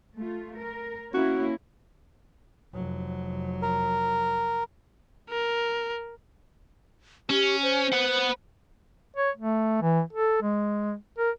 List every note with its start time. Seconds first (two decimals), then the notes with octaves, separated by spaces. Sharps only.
0.16 A3 F4
0.57 A#4
1.14 A#3 C#4 E4 F#4
2.73 F1 F#3
3.62 A#4
5.30 A#4
7.30 C#4 G4
7.63 C5
7.92 B4 F#5
9.16 C#5
9.37 A3
9.82 E3
10.13 A4
10.43 G#3
11.18 A#4